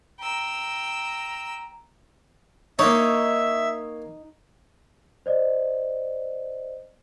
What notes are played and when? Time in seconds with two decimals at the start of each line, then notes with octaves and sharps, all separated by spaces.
0.20 G5 A#5 E6
2.79 A#3 D#4 C#5 E5
5.26 C5 D5 D#5